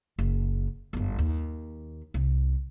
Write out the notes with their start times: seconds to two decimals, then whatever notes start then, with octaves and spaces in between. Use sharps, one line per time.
0.18 F#1
0.93 G1 F#2
1.18 D#2
2.14 C2